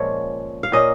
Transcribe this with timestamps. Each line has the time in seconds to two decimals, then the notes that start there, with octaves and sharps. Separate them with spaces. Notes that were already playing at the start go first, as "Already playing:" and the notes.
Already playing: A#2 F3 G#3 C#4 A#4 C#5
0.63 F5
0.72 A#2 A#3 C#4 D#5